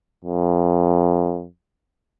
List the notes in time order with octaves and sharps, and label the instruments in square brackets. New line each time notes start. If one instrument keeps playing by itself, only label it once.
[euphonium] F2